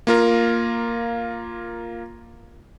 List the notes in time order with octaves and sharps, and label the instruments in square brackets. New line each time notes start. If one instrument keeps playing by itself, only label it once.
[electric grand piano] A#3 F4 A#4